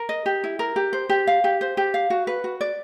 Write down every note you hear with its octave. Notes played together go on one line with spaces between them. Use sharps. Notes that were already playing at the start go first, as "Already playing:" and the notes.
Already playing: A#4
D#5
G4
E4
A#4
G4
C5
G4
F5
G4
C5
G4
F5
F#4
B4
F#4
D5